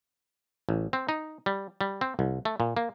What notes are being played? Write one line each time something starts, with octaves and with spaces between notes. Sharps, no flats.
A1
C4
D#4
G3
G3
C4
C2
A3
A#2
A#3